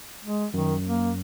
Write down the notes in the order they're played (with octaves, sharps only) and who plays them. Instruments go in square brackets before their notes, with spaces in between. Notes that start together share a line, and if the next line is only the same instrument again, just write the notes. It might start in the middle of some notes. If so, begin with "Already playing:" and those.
[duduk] G#3
[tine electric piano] F#2 [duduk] D#3
[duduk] A#3